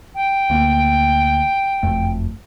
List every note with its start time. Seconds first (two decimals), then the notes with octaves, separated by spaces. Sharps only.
0.15 G5
0.50 D2 A#3
1.83 F#1 F2 A3